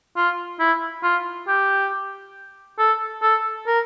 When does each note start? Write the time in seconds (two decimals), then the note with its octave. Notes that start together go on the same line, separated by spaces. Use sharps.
0.16 F4
0.59 E4
1.03 F4
1.48 G4
2.79 A4
3.22 A4
3.67 A#4